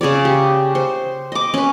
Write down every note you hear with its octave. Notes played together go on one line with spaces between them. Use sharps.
C#3 G#4 C#5 D5
G4
C5
D#5 D6
C#4 B4